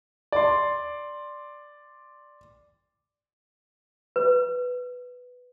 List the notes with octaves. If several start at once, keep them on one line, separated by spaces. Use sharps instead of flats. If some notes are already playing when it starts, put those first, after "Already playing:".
D5 C6
B4